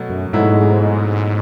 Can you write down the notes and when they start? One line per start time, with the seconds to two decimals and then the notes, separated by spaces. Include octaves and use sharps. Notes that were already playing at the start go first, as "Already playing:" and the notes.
Already playing: B2 F#3 A3
0.09 F#2
0.33 G#2 B2 F#3 A3 E4